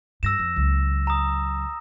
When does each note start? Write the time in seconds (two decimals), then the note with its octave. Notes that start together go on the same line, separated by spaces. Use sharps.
0.23 G2 E6 A#6 E7
0.39 F2
0.56 C#2 F#3
1.07 A#5 D#6